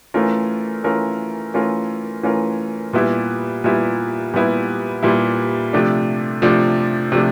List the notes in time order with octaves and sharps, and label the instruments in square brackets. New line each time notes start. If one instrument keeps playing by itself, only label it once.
[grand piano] E3 A3 C#4 F4 A#4
E3 A3 C#4 F4 A#4
E3 A3 C#4 F4 A#4
E3 A3 C#4 F4 A#4
A#2 G3 B3 E4
A#2 G3 B3 E4
A#2 G3 B3 E4
A#2 G3 B3 E4
C3 F3 A3 D4
C3 F3 A3 D4
C3 F3 A3 D4